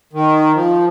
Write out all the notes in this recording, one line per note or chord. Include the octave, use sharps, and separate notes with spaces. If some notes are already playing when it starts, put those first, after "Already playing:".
D#3
F3